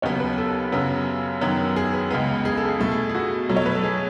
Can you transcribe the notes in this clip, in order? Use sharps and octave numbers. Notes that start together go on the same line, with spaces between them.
D#2 C#3 F#3 B3 C#5
B4
A4
F#2 C#3 F#3 B3
F#2 D#3 F#3 B3
G#4
B4
C#2 C#3 G#3 B3
G#4
A4
G#4
B2 A3 A4
G#4
G#4
F#4
B2 F#3 A3
C#5
B4
A4
G#4